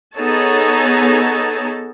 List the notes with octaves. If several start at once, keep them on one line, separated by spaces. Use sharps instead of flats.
B3 D#4 G#4 A4 C#5 A5